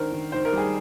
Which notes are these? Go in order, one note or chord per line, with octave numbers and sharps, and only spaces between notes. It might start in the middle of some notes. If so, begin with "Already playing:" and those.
Already playing: D#3 D4 A#4 C5
D#3
D#3 C5
A#4
G3 G#4